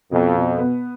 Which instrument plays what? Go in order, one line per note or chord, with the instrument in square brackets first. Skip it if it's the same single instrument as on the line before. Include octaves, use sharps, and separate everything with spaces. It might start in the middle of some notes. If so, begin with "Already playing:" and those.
[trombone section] F2 [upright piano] B2
[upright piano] B2
B3